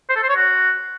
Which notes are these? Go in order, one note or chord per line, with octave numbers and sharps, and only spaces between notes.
C5
A4
C5
C#5
F#4